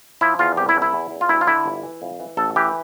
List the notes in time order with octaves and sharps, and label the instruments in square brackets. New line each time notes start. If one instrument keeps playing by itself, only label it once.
[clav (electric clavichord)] F3 E4
E2 F4
C2 G4
E4
C2
E4
E2
E2
F4
D2 E4
F4
D3 E4
G1
E3
F2
E3
A1 A4
E3 G4